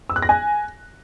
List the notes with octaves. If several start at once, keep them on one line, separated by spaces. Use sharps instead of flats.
E6
F#6
A#6
G#5